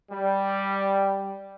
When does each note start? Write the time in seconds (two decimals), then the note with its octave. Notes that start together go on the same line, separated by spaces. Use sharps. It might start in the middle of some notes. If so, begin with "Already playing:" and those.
0.12 G3